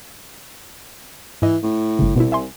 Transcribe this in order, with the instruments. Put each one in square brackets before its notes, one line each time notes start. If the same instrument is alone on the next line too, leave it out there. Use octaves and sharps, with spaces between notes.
[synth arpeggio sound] G#2 D#5 [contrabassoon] E3
[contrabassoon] A2
[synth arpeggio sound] G1 C#3
[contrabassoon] C2 [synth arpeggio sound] B2 E4
[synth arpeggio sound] E5 G#5 C6